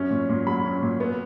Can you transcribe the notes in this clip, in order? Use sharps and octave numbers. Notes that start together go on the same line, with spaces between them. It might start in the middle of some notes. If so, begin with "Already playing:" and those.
Already playing: F#2 C#4
A#2
A#2
F#3 B5
C#4
A#2
B3